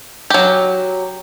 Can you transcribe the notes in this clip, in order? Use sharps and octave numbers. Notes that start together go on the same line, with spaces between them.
F#3 G4